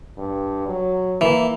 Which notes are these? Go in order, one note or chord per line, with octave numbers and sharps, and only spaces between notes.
G2
F#3
E3 A#3